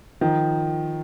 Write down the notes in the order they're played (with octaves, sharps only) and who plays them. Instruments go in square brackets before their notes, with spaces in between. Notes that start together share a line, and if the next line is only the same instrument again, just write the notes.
[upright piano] D#3 F3